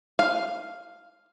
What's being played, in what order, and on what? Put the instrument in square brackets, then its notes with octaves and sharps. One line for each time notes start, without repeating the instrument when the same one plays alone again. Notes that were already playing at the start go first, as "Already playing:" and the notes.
[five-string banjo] F5